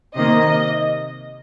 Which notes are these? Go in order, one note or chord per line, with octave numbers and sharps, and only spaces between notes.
C3 D#3 A#3 D#5